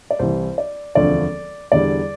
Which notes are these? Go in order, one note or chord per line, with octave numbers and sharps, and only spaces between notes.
D5
C2 C3 E3 C5
D5
E1 D2 D3 F3 C4 D5
E2 D3 G3 D5